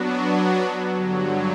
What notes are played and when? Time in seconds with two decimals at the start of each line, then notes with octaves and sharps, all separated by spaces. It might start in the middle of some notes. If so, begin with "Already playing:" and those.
Already playing: F#3 B3 D4 F#4
0.90 G2 D3 F#3